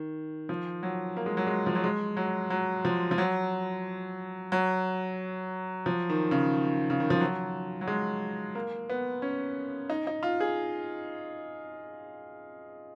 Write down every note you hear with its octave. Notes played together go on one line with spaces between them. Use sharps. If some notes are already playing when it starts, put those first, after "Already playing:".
Already playing: D#3
F3
F#3
A#3
G#3
F#3
G#3
F3
F#3
G#3
F#3
F#3
F3
F3
F#3
F#3
F3
D#3
C#3
C#3
D#3
F3
F#3
F#3
G#3
A#3
B3
C#4
D#4
D#4
F4
G#4